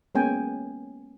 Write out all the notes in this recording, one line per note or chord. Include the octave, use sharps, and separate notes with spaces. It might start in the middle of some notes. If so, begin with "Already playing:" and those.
G#3 A#3 B3 C#4 G5 G#5